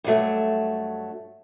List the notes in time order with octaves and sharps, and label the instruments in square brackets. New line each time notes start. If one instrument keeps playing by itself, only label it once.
[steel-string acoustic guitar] G2 F#3 A3